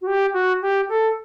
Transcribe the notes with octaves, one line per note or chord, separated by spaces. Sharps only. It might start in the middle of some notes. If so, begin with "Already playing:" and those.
F#4
G4
F#4
G4
A4